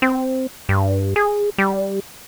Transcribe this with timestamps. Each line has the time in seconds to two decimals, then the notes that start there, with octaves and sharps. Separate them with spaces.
0.02 C4
0.69 G2
1.16 G#4
1.58 G3